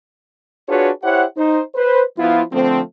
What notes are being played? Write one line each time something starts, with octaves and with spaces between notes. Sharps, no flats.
D4 F4 F#4 G#4 B4 C#5
E4 G4 C5 C#5 F#5
D#4 C5
B4 C5
F3 B3 E4 F4
D3 F3 A3 C4